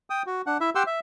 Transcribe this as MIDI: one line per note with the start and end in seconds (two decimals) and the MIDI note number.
0.10 0.22 79
0.10 0.22 87
0.26 0.42 66
0.47 0.58 62
0.47 0.58 78
0.61 0.70 64
0.61 0.70 76
0.75 0.83 67
0.75 0.83 78
0.75 0.83 79
0.75 0.83 84
0.75 0.83 86
0.75 0.83 88
0.87 1.00 76